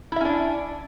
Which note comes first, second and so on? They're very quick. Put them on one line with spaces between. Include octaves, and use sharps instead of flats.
E4 E5 C#4 D4